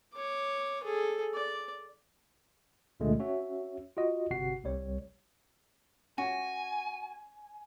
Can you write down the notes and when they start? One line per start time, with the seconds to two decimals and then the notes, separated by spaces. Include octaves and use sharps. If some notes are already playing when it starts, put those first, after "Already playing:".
0.14 C#5 D6
0.83 G#4 A4
1.34 D5
3.00 C#2 A#2 D3 G#3 A3
3.19 C#4 F#4 C#5 E5
3.97 F4 F#4 D#5
4.31 G1 C3 F#4 F#5 C7
4.64 C2 G3 C#5
6.18 C#4 F#4 G#5